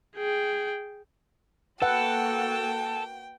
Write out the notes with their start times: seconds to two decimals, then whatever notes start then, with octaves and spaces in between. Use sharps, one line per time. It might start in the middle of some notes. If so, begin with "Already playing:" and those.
0.16 G#4 G5
1.82 A#3 F#4 A4 B4 F#5 G5